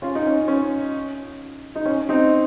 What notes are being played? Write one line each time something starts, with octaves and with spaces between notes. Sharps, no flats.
C#4 F4
D#4
C#4
C#4
D#4
C#4
C4 D#4